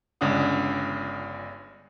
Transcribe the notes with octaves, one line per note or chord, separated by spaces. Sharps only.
G1 C#3 G#3 D4 F#5 D#6